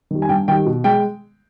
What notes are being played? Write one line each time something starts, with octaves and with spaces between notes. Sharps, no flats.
D#3 G3
G#5
G2 G5
D#3 G3 G5
B2
G#3 G5